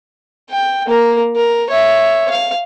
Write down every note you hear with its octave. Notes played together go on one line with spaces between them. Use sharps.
G5
A#3 A#4
A#4
C#5 E5
F5